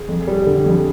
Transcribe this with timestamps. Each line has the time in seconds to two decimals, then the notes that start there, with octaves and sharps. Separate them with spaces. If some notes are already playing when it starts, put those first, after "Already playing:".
Already playing: G#4
0.08 F2
0.28 G3
0.46 D3
0.66 F2